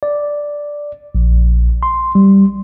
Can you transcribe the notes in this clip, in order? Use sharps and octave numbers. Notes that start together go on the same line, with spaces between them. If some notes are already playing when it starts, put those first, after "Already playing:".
D5
A#1
C6
G3